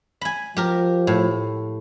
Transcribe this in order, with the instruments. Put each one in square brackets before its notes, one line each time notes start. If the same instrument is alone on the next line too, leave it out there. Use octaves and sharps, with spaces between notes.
[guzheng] G#5 B5
[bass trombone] F3 [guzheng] G4 A#4
[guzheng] A2